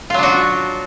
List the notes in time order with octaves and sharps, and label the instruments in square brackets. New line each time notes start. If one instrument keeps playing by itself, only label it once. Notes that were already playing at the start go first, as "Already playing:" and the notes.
[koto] F4
F#3
D4
F#4